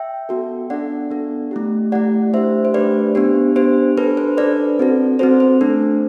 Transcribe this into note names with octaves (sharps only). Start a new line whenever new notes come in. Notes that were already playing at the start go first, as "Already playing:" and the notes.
Already playing: E5 G5
B3 F#4 A4
B3 D4 A4 D5 F#5
B3 D4 A4
A3 E4 G4
A3 E4 G4 D5 F#5
A3 D4 G4 C5 E5
C5
A3 D4 G4 B4 D5
B3 D4 G4 C5
B3 D4 G4 C5
D4 A4 B4
C5
D4 A4 B4 D5
C4 F#4 A4
C4 F#4 A4 C5
C5
A3 D4 A4